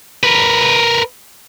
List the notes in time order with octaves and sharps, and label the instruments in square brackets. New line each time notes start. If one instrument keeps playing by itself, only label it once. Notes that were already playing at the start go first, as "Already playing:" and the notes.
[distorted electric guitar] A#4 B4